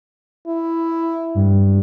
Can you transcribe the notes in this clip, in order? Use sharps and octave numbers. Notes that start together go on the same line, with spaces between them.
E4
G2